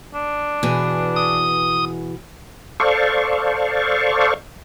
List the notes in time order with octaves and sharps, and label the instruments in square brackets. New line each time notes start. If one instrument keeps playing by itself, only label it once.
[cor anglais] D4
[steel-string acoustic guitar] B2 E3 G#4
[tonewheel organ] D#6
A4 C5 D5 F5 C#6